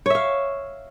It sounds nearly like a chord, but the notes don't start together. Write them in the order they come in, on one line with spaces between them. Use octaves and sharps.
C#5 E5 F5